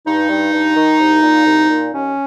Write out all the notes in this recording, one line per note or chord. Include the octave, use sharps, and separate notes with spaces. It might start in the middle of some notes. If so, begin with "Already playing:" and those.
G2 D#4
G2
G2
D#3
C2
A#2
C2
A#2
D#2 C#4